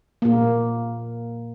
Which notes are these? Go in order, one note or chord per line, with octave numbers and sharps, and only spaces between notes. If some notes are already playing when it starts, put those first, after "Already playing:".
A#2 A#3